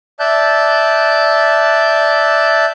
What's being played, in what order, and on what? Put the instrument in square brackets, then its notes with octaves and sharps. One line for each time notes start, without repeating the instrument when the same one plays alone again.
[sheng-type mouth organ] D5 E5 A5 F#6 G6